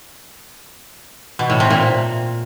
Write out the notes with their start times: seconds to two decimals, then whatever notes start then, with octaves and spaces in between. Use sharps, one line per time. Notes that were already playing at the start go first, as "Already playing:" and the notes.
1.39 B2
1.50 A2
1.60 C3
1.71 A#2